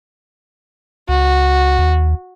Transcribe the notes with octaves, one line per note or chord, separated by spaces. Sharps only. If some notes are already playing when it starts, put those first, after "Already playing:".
C#2 F#4
D#2